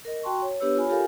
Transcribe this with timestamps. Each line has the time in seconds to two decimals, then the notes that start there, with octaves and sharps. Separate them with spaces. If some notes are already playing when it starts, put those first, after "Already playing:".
0.05 A#4 D#5
0.23 F#4 G5 A5 C6 C#6
0.42 C#5
0.60 B3 D4 G4 B4 C#5 E6
0.75 F4 C#5 G#5 B5
0.88 F4 G4 A4 A#4 F5 G#5